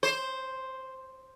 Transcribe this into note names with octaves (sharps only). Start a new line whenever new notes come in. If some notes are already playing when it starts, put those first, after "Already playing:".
C5